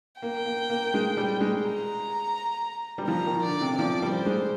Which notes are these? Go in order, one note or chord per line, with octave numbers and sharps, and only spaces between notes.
A#3 G5
A#3
A#3
G#3
G3
G#3
A#5
G3
F3 A#5
D#3
D3 D5
C3
F3 D5
G3
C5
G#3